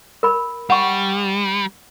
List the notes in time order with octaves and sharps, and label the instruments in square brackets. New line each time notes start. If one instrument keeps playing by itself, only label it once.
[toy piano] A#4 B5
[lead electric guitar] G3 [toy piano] F#5 C#6